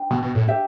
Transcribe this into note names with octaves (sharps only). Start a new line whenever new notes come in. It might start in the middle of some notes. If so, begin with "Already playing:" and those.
Already playing: D4 B4 G5
B2
B2
A2
D4 G4 E5